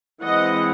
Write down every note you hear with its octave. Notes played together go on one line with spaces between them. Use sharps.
E3 G#3 C4 D#5 F#5